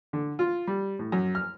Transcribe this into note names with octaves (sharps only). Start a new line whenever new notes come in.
D3
F4
G3
A2
F#2
F6